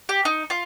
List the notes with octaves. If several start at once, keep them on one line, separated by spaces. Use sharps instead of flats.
G4
D#4
F4